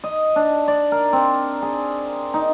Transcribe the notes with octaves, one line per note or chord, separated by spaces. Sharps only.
D#5
D4
D5
A#4
C4
G#4
D#4